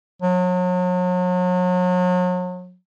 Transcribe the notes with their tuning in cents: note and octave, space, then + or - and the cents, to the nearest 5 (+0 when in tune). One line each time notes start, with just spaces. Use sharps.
F#3 -35